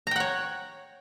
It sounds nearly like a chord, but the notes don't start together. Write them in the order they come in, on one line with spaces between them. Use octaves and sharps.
A#5 G5 F#5 C#5